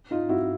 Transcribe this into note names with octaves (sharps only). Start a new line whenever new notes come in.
D#4 F4
E4 F#4